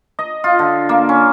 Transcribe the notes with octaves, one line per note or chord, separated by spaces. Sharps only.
D#5
F4
D3
A#3
C#4